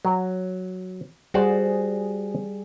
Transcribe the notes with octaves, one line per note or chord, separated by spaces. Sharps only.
F#3
G3 F#4 G#4 C5 D5